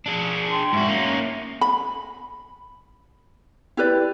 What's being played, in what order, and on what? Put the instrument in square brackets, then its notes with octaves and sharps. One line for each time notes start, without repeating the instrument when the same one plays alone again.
[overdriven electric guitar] D4 G#4
[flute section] G5 A5 C6
[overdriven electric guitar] G#2 F#4 [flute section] E5
[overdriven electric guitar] A#3 C#4
[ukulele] B5
E4 G4 B4 D5